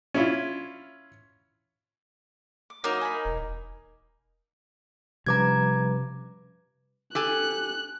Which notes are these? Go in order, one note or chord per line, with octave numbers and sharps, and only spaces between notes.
C#4 E4 F4
D6
F#3 A#3 D#4 A#4 D#5 E5
G#5 A#5 B5
A#4
E1
C3 F3 G3 C#4 B4 A#5 D6 G#6
G4 A4 G#5 F#6